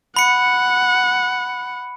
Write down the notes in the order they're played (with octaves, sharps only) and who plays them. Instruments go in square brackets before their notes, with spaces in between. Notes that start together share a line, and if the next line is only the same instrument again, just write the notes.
[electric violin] F#5 [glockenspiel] B5 C#7